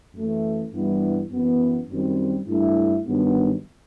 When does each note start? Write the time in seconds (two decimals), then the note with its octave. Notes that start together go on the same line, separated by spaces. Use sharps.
0.15 F#2 E3 A3
0.74 G2 E3 G3 B3 E4
1.32 F#2 E3 B3
1.90 F#2 D#3 G3 C4
2.48 G2 F#3 A3 E4
3.07 G2 D#3 F#3 B3